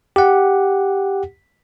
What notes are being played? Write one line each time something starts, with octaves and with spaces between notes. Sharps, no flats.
G4 F#5